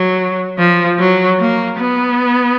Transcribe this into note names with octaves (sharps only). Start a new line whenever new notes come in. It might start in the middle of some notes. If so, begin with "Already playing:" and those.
Already playing: F#3
F3
F#3
A#3
B3